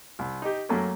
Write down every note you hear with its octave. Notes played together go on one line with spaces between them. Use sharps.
C2
D#4 G4
F#2 A3 A#3 C#4